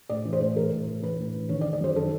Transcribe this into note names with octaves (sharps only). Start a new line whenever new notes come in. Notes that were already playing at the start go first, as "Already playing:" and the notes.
A2 D5
E3
C5
A2
E3 A#4
A2
E3
E3 B4
A2
E3
D#3 C#5
D5
D#3
D5
F#2 C5
D#3 A4